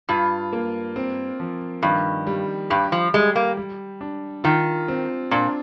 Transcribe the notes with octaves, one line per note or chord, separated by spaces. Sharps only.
G2 F4
A#3
C4
F3
G2 D#3
G3
G2 G4
F3
G3 G#3
A#3
G3
D4
D#3 F4
C4
A#2 D4